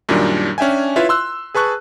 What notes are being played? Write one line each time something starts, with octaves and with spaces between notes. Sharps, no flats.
F#2 A#2 D#3 G3 D4
C#4 D4 E5 G5 G#5
E4 F4 B4 C#5 E5 F5
C6 E6 F#6
G#4 B4 A5 C#6 F#6